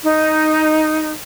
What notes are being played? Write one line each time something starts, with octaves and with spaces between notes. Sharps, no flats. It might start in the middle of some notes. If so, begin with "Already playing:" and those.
D#4